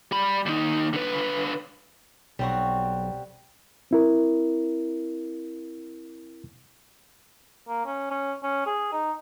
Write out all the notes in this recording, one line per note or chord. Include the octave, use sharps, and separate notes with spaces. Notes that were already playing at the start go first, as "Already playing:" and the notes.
G3 B5
D#2 D#4
D3 B4
B1 G3 C4 F#4
C4 E4 A#4
A#3
C#4
C#4
C#4
G#4
D#4